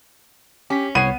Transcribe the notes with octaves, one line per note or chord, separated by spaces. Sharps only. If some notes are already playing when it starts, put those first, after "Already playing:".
C#4 G4 B6
C2 B3 C#5 C7 D#7